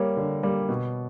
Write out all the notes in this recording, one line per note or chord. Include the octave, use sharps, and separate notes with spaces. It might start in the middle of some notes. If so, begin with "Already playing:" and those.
Already playing: G3 A#3 C#5
D3
G3 A#3
B2